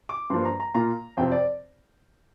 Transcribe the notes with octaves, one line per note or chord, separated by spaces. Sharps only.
D6
G2 F3 A#3 C6
A#5
A#5
A#2 A#3 F4 A#5
F2 C3 F3 C4 G5
D5